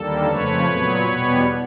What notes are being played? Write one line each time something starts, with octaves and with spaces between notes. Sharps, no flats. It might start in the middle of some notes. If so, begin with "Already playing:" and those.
Already playing: D#2 D3 G3 A#3 A4
F2 C#3 F3 A3 B4 C#5
A#2 F#3 B3
E2 B2 G3 B3